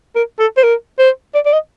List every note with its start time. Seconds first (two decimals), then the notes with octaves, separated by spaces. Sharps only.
0.15 A#4
0.39 A4
0.57 C5
0.63 A#4
0.99 C5
1.34 D5
1.45 D5
1.53 D#5